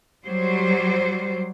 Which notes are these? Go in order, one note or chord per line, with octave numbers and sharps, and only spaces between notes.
F#3 G3 C5